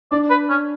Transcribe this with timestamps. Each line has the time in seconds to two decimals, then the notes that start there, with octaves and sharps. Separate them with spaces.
0.12 D4 D5
0.30 B4
0.49 C#4